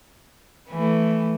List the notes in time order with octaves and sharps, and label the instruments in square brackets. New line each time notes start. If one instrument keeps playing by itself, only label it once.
[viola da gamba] E3 A3